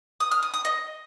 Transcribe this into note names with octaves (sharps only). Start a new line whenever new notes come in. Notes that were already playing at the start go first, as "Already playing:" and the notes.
D#6
F6
D#6
D#6
D#5